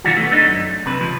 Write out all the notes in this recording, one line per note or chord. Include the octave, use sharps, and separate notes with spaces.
B2 D#3 E3 G3 F4 F#4
A3 B3
A3 D4 D#4
F#2
C3 B4
C#2 F3